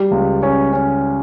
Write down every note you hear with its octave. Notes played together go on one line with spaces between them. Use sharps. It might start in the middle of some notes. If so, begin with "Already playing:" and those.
Already playing: G3
C#2
C#4
C#4